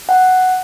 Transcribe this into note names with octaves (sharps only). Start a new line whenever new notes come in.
F#5